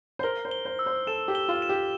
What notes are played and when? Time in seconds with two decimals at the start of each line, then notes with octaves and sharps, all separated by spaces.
0.19 C5
0.23 A#4 G7
0.45 C5
0.51 G7
0.65 C5
0.79 E6
0.86 C5
1.07 A4 E7
1.28 G4
1.35 G7
1.48 F4
1.62 E7
1.69 G4